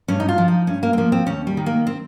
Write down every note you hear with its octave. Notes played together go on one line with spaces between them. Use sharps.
G2 C#4
D#4
F4
F3
D#4
G2 C#4
A#3
C4
F3 A#3
C4
D#2 C#4
G3
D#3
A#3
C4